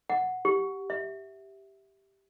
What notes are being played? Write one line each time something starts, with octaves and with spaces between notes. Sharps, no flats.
F#5
G4
E5